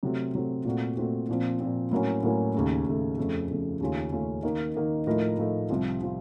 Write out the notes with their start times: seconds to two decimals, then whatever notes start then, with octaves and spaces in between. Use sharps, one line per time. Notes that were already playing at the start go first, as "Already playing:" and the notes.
0.03 C3 F#3 A3 C4
0.34 C3 F#3 A3 C4
0.65 A#2 A3 C4 F#4
0.97 A#2 A3 C4 F#4
1.29 A#2 F3 C4
1.60 A#2 F3 C4
1.91 A2 F#3 A#3 C#4
2.23 A2 F#3 A#3 C#4
2.54 D#2 C#3 A3
2.86 D#2 C#3 A3
3.18 F2 C#3 A3
3.49 F2 C#3 A3
3.81 D#2 C#3 A3 C#4 F4
4.12 D#2 C#3 A3 C#4 F4
4.43 D#3 A#3 D#4
4.75 D#3 A#3 D#4
5.07 A2 F3 A3 D#4 A#4
5.38 A2 F3 A3 D#4 A#4
5.69 C2 C3 F3 C4 F4
6.02 C3 F3 C4 F4